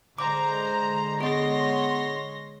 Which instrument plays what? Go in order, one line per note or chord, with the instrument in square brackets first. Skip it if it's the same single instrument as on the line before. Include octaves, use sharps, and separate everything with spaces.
[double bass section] D3 G#3 [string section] C5 A#5 [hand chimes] D6
[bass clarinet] B3 [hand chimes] G#4 D#5 [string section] C#5 C6 A#6